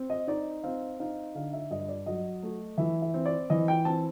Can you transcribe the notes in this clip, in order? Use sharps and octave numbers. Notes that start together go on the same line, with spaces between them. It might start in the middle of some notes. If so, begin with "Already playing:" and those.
Already playing: C4
D#5
D#4 D5
C4 F5
D#4 F5
D3 F5
E5
G2 D#5
D5
F#3 D#5
A3
E3 E5
E5
C4
D5
E3 D#5
G5
C4 A5